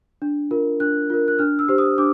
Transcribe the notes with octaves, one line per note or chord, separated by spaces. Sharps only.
D4
F4 A#4
D4 F#6
F4 A#4
F#6
D4 F6
E6
G4 C5
D#6
D4 D6